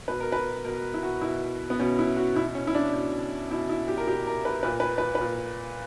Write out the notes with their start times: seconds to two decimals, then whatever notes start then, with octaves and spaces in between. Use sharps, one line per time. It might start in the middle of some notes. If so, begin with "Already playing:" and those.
0.08 B2 B4
0.20 A#4
0.32 B4
0.65 B2 A#4
0.94 E4
1.03 F#4
1.21 B2 E4
1.70 B3
1.79 B2 C#4
1.99 E4
2.16 F#4
2.36 B2 E4
2.55 C#4
2.67 E4
2.75 D4
2.93 B2
3.51 B2 E4
3.69 E4
3.88 G4
3.98 A#4
4.07 B2 G4
4.27 A#4
4.45 B4
4.63 A#2 B4
4.80 B4
4.98 B4
5.15 B4
5.21 A#2